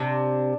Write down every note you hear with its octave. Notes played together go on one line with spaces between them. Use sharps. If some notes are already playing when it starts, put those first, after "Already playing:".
Already playing: C3 D4